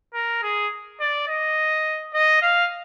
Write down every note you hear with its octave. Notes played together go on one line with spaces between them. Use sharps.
A#4
G#4
D5
D#5
D#5
F5